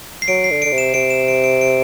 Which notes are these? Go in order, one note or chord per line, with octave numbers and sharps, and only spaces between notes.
C7
F#3 D7
C7
D3
D3 D7
C3
E7
C3 D7
E7
D7
D7
D7